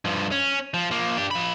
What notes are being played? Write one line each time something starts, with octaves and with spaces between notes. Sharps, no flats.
G2 F3
C#4
F3
F3 A#3
D4 G4
F3 B5